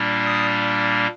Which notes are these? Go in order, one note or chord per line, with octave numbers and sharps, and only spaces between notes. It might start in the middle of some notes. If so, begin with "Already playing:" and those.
Already playing: A#2 G3 A#3 D4
D#6